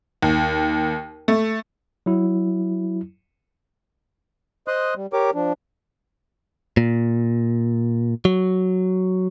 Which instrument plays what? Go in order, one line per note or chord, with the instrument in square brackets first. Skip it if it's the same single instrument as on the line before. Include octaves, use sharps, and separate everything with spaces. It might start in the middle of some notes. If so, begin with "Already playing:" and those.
[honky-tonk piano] D#2
A3
[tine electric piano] F#3 E4
[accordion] C5 D#5 C6 D#6 F#6
G3
G4 A#4 C#5 D6
F3 D4
[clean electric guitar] A#2
F#3